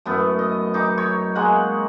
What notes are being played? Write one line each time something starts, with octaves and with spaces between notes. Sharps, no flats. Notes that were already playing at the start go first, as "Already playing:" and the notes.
F#2 A2 B3
D#5
D#4 D6
C#5
G#3 A#3 F#5